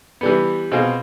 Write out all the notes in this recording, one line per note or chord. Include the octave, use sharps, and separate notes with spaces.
E3 G3 B3
B2 C4 F4 G#4